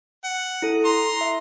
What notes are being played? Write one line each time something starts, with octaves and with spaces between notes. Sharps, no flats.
F#5
E4 A4
A#5 C6
E5